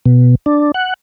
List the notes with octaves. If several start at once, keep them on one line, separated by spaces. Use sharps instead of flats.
B2
D4
F#5